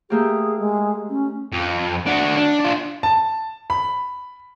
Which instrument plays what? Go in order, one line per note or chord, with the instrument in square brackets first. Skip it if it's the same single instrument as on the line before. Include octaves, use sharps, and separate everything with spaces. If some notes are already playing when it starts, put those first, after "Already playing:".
[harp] A3 A#3 G4 [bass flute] G#4
[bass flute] G#3
C#4
[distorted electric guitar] F2
D4 F#4
D4
D4 F4
[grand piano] A5
B5